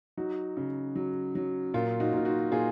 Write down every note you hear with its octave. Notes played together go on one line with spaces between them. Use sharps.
F#3 D#4 F#4
C#3
F#3
F#3
A#2 F4
D#4 F#4
A#2 F4
D#4 F#4
A#2 F4 G#4